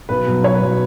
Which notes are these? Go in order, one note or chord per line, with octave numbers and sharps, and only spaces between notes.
B1 B4
B2 F#3
B1 C#5
B4
B2 F#3